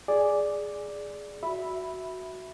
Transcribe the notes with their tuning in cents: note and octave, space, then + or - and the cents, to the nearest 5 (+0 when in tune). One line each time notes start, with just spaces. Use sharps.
G#4 +0 D5 +0
F#4 +0 E5 +0 B5 +0